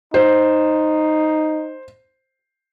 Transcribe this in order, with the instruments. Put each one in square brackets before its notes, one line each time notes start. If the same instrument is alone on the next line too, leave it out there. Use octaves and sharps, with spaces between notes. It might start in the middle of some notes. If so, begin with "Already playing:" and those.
[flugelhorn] D#4 [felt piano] C5